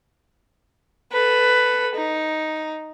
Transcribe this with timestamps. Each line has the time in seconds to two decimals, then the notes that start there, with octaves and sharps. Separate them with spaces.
1.12 A4 B4
1.95 D#4